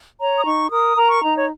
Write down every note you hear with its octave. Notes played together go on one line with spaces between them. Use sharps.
C#5 A#5
D#6
D#4 C#6
A#4 D#6
A#4 A#5
C#6
D#4 A#5
C#5